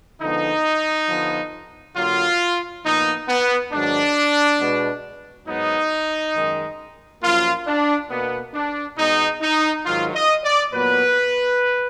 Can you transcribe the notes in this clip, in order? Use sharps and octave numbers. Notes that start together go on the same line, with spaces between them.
D3 F3 G#3 B3 D#4
D3 F3 B3
D3 F#3 A#3 F4
A#2 F3 B3 D#4
B3
G#2 D#3 F#3 D4
B2 G#3 B3
G#2 F#3 B3 D#4
F#2 D#3 G#3
F#2 F3 A#3 F4
D4
B2 A#3 B3
D4
B2 G#3 B3 D#4
D#4
G#2 D#3 F#3 F4
D#5
D5
A#2 F#3 B3 B4